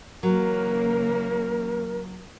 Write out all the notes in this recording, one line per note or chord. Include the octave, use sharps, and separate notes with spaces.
C#3 E3 F#3 A#3 A#4